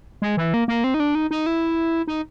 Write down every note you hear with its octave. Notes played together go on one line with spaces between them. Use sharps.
G#3
E3
A#3
A#3
C4
D#4
D4
D#4
D#4
E4
D#4